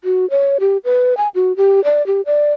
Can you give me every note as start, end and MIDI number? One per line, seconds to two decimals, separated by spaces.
0.04 0.29 66
0.30 0.57 73
0.60 0.77 67
0.85 1.17 71
1.17 1.28 80
1.35 1.56 66
1.57 1.83 67
1.84 2.05 74
2.07 2.21 67
2.26 2.53 74